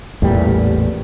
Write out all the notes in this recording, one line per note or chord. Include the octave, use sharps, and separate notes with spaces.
A1 E2 A#2 G3